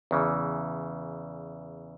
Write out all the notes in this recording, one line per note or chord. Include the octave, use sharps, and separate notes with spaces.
E2 C#3 E3